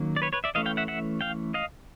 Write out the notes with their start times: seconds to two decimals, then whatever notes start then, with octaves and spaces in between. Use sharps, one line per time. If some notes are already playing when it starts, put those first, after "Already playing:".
Already playing: D#3 F#3 A#3 C#4
0.16 D5
0.22 B4 C#5
0.33 B4 C#5
0.44 D5 E5
0.55 E3 A3 C#4 D#5 F5
0.66 F5 G5
0.77 E5 F#5
0.88 E5 F#5
1.21 F5 G5
1.54 D#5 F5